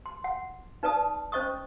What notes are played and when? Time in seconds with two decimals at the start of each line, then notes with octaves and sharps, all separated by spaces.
0.06 C6
0.24 F#5
0.83 D#4 B4 D5 A5 D#6
1.32 C#4 C5 D#5 C#6 D#6